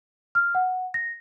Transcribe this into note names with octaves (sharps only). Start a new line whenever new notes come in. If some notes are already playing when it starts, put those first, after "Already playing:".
F6
F#5
A#6